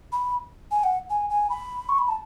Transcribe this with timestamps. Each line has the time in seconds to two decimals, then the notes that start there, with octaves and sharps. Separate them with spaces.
0.12 B5
0.71 G#5
0.83 F#5
1.10 G#5
1.29 G#5
1.50 B5
1.89 C#6
1.98 B5
2.08 A5